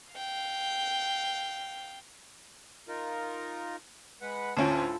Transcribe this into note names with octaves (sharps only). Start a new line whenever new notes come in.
F5 G5
D#4 F4 A#4
G#3 B4 F#5
D2 A2 C#4 F4 A4 A5